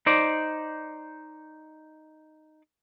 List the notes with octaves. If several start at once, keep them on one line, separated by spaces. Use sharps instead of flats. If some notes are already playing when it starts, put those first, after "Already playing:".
D#4 C5 D5